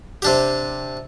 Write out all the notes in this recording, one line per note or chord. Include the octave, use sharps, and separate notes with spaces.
C3 D4 G4